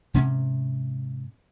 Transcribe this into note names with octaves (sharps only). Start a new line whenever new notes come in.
G#2 C3 C#4